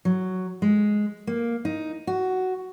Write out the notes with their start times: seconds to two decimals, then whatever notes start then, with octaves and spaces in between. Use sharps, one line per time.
0.05 F#3
0.62 G#3
1.27 A#3
1.65 D#4
2.07 F#4